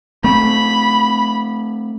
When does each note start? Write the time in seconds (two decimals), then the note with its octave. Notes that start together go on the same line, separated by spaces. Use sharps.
0.24 A3 C4 B5